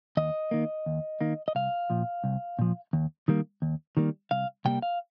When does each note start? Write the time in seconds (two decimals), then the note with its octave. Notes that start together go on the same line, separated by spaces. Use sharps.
0.17 D#2 D#5
0.51 D#3 A#3
0.86 D#2
1.21 D#3 A#3
1.48 D#5
1.55 C2 F5
1.90 A#2 F3
2.24 C2
2.59 A#2 F3
2.93 D#2
3.28 D#3 G3 A#3
3.62 D#2
3.97 D#3 G3 A#3
4.31 C2 F5
4.65 C3 G3 A#3 G5
4.82 F5